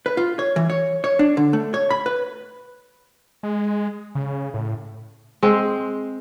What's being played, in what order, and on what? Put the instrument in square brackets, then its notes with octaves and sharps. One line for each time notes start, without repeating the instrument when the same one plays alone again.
[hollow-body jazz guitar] B4
F4
C#5
E3
C#5
C#5
D4
D3
A3
C#5
B5
B4
[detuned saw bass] G#3
C#3
A2
[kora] G#3 C4